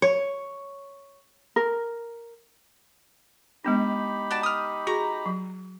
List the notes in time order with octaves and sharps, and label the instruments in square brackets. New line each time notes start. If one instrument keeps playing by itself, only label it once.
[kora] C#5
[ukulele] A#4
[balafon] G#3 B3 D4 [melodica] D#4 G4 B5
[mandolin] F#4 D5 A5
D#6 F6
[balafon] F#4 G#4 C#6 [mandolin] A#5
[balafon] F#3